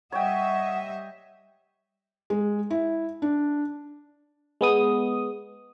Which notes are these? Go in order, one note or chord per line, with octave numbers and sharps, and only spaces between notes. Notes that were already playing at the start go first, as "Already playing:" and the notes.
G3 C#5 D#5 E5 F#5 G5
G#3
E4
D4
G#3 B3 D#6